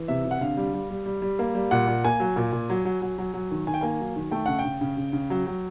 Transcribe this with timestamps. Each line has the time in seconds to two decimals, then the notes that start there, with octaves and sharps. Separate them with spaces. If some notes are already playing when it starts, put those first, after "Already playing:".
Already playing: E3
0.08 C3 E5
0.25 C3
0.31 F#5
0.41 D3 F5
0.57 G3
0.74 G3
0.90 G3
1.06 G3
1.22 G3
1.39 A#3
1.55 G3
1.71 A#2 F#5
1.88 A#2
2.05 A#3 G#5
2.20 F#3
2.36 A#2
2.52 A#2
2.70 F#3
2.85 F#3
3.02 F#3
3.18 F#3
3.34 F#3
3.51 D#3
3.67 D#3 G#5
3.74 G5
3.81 A#3 G#5
4.00 F#3
4.16 D#3
4.31 A3 G5
4.46 C#3 F#5
4.59 G5
4.65 C#3
4.81 C#3
4.97 C#3
5.13 C#3
5.30 F#3
5.47 F#3